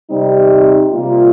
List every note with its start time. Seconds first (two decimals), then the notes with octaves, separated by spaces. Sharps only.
0.10 C3 G3 C4 D#4
0.92 C3 G3 A#3 F4